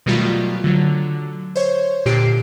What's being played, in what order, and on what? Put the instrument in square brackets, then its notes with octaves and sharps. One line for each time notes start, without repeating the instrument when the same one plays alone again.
[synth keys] B2 D#3 F#3 G3 A3 F4
D3 F#3
C5 C#5
A#2 D3 G4 C7 D7